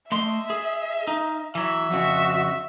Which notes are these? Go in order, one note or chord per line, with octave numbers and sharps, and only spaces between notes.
A3 D#5 E5 C6
G#4
D#4
E3 F#3 E5
F2 C#3 F#4